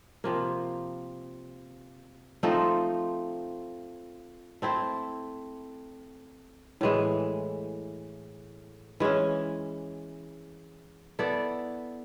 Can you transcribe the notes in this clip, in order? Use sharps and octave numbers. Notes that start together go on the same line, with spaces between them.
C3 F3 A#3
F3 A3 C4 D#4
A3 C4 E4
A2 E3 G#3
E3 G#3 C#4
B3 E4 A4 D5